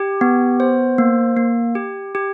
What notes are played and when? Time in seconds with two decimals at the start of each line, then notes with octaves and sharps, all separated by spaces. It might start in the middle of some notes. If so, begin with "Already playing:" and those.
Already playing: G4
0.21 B3
0.60 C5
0.98 A#3
1.37 A#3
1.75 G4
2.15 G4